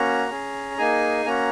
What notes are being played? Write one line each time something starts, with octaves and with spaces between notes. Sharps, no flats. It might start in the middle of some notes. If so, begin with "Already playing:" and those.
Already playing: A#3 C#4 F#4 A#5
C#4 G#4
A#3 D#4 G#4 G#5
A#3 C#4 F#4 A#5